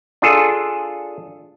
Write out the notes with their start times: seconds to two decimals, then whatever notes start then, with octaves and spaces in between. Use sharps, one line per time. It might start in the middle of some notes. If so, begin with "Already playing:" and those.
0.22 D4 F4 G#4 A4